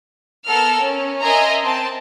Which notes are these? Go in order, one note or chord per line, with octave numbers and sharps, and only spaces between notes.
B3 A4 A#4 E6 F6
C#4
A#4 D#5 E5 G#5 A#5 C6
C4 A5